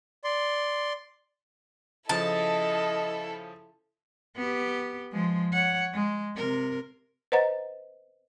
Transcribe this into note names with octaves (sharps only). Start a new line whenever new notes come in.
D5 C6
C#3 F3 E4 A4 D#5 A5
B3 G4
F3 G#3
C#5 F#5
G#3
C3 A#4
B4 C5 D#5 F#5 A#5 A6